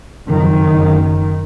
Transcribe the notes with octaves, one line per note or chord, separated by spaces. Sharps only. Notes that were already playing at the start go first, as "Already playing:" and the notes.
F#1 F2 D#3
F#1 F#2